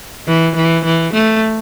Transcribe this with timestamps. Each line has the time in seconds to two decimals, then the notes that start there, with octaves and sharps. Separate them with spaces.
0.27 E3
0.56 E3
0.85 E3
1.14 A3